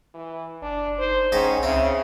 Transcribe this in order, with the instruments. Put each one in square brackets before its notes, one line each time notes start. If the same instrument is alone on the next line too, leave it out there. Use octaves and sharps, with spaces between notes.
[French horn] E3
[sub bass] F#1 [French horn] D4
[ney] D#4 [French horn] C5
[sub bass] B1 [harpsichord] G#2 D#4 A5 [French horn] C#4 [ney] G5
[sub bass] C#2 [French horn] C#3 [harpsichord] C4 [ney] E5